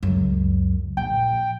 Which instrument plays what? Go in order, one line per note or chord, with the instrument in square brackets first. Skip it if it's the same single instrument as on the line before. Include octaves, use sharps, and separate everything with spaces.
[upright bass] C#2 F#2
[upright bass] A#1 [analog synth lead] G5